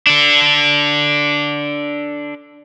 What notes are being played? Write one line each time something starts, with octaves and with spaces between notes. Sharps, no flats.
D4 A4